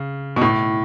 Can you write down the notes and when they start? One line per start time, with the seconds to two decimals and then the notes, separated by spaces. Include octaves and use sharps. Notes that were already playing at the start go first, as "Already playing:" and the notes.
Already playing: C#3
0.36 B2
0.42 A2